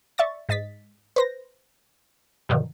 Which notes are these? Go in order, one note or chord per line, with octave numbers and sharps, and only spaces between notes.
D5 E5 C#6 A6
G#2 D#5 A6 B6
B4 C5 A#6
G2 B2 D3 D#3 F3 F#3